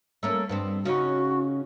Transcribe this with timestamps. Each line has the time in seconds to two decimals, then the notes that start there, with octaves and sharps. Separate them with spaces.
0.23 A3 A#3 C#4
0.49 G2 B3 C4
0.85 C#3 C#4 D#4 F#4